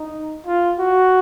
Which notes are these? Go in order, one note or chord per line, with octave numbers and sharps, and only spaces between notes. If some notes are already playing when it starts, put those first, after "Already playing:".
Already playing: D#4
F4
F#4